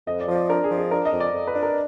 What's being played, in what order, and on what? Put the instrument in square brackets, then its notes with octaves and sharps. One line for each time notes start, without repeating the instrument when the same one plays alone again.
[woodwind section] F2 [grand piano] D#5
[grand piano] D5
[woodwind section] F3
[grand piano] D5
[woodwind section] D4 [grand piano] A#4
[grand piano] G#4
[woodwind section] F3
[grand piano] G#4
[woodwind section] D4 [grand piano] A#4
[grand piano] D#5
[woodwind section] F2
[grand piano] D5
[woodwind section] F2
[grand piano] B4
[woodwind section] D4
[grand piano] A#4